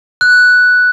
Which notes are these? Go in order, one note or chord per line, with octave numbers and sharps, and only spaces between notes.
F#6